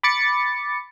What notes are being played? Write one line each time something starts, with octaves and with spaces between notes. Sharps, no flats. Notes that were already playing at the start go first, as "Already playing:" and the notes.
B5 D6 A6 C#7